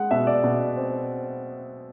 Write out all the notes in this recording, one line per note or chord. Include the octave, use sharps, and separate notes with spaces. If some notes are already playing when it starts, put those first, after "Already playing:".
Already playing: G#3 F#5
B2 E5
D5
B2
C4